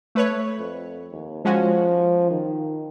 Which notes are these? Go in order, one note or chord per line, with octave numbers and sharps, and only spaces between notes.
A3 B4 C#5
F2
D#2
F3 G#3 C#4 F#4
D#3